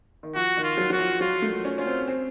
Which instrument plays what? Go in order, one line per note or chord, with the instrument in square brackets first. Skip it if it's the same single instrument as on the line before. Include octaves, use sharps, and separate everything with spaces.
[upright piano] D#3
[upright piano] F3 [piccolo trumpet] F#4
[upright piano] D#3
[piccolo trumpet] F4
[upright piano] F#3
[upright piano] F#3 [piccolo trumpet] F#4
[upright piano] F3
[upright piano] F#3 [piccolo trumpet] F4
[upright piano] A3
C#4
[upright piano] C#4 [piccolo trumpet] F4
[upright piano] C4
C4